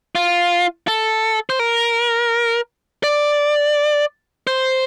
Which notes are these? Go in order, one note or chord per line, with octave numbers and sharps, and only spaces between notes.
F4
A4
C5
A#4
D5
C5